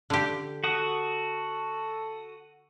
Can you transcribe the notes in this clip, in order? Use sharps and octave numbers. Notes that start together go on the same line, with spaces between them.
D3 G4
F#4 A4 D#6